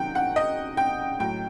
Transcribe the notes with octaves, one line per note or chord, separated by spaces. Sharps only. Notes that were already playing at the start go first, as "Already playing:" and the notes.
Already playing: C3 D#3 F#3 F#5 G5
F#5
D#5
G5
A2 F#3 G5